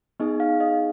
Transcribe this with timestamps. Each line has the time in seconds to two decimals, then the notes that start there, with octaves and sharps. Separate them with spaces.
0.20 B3 D#4 G#4 D#5
0.40 F5
0.60 D#5